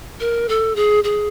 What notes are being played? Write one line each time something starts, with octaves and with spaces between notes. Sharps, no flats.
A#4
A4
G#4
G#4